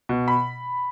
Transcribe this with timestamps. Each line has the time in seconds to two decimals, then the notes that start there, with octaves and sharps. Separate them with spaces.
0.09 B2
0.28 B5